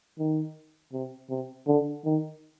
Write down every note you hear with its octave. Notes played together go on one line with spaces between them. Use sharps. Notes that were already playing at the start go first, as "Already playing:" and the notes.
D#3
C3
C3
D3
D#3